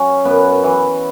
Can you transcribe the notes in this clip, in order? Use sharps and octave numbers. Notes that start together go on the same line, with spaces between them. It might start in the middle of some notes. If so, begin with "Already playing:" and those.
Already playing: F#3 C#4
F#2 B3
E3